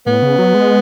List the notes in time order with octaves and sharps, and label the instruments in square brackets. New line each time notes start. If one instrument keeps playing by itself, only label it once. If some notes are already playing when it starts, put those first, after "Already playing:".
[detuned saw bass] A2 [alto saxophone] B3
[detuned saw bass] C#3
F#3
G#3